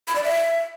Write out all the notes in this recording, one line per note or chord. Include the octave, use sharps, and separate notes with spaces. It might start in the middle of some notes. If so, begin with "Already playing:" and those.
B5
D5
E5